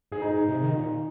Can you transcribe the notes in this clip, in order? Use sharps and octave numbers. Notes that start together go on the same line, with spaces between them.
G#2 G#4
D#4
G#2
C3
D#3
A#2